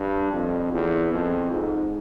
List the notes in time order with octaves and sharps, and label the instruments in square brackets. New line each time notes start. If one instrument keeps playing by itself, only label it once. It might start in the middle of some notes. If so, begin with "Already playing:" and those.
Already playing: [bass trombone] G2
F2
E2
F2
G#2